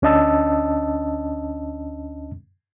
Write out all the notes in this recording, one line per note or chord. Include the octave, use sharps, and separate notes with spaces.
D2 C#4 D4 D#5 A5 E6